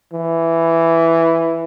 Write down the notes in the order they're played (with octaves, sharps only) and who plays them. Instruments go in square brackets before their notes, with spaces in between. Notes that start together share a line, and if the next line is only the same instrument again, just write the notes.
[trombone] E3